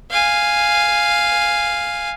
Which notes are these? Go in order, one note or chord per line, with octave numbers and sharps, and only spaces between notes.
F5 G#5